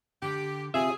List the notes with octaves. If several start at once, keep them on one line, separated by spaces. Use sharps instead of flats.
D3 G4
C3 F4 G#4 E5